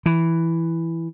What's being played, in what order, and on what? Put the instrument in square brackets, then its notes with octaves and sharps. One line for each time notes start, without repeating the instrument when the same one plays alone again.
[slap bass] E3